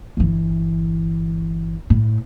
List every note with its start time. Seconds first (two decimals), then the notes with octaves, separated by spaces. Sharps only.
0.17 G1 E3
1.90 A2